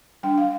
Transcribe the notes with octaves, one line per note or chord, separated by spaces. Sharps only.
G3 D4 G5
F5